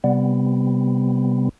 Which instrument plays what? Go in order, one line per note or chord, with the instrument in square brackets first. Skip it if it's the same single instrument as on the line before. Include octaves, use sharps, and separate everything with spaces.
[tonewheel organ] C3 G3 B3